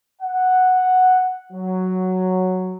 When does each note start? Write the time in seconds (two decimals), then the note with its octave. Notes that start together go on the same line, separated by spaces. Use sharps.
0.22 F#5
1.53 F#3